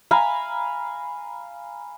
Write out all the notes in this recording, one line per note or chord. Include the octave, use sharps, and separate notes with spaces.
F5 G#5 A#5 B5